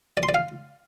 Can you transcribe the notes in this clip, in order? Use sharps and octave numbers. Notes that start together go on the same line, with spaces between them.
D5
C6
D5
F5